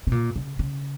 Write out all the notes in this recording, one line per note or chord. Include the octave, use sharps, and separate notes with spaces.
C3
A#2
C#3
C#3